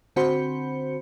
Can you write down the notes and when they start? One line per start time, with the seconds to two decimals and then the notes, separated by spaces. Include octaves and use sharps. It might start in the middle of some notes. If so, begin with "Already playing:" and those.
0.16 D3 C4 F#4 C5 B5 C#7